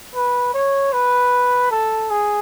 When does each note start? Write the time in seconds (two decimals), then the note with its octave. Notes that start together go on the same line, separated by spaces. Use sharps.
0.15 B4
0.54 C#5
0.93 B4
1.71 A4
2.10 G#4